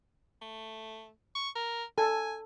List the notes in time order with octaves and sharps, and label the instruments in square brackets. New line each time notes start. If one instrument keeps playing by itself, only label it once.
[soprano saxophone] A3
C#6
A#4
[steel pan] A4 [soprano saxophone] G#5